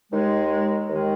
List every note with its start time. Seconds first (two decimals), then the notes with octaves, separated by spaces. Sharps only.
0.11 D#2 D#3 G#3
0.89 D#2 D#3 G#3